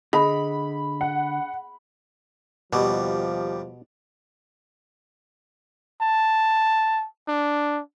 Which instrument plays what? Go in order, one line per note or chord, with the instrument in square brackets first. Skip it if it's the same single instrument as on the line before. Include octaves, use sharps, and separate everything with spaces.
[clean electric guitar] D3 [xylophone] G#4 D#5 [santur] B5
[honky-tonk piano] F#5
[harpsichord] D#2 G3 [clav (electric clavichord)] B2 [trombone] F3
[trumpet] A5
D4